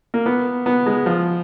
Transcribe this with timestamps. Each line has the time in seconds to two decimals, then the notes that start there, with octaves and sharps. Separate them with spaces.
0.14 A#3
0.26 B3
0.66 B3
0.86 G#3
1.06 F3